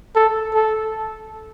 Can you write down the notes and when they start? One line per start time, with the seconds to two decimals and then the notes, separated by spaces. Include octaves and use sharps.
0.15 A4
0.54 A4